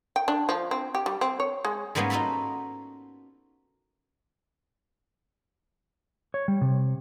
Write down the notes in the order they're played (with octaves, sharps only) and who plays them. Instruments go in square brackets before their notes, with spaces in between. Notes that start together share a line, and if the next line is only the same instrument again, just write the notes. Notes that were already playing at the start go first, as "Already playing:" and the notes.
[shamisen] G5
D4
F3
C4
G4
G3
C4
C#5
G#3
[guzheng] G#2 G3 A#3 B3 C#4 G#4
D#4 F4 F#4 A4 A#5 B5
[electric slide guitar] C#5
G3
C3